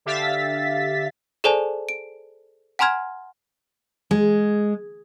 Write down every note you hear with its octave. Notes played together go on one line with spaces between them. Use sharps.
D3 G4 E5 F5 A6 B6
G#4 A4 C5 D5 G#5 A5
D7
F#5 G#5 A#5 C6 F6 G#6
G#3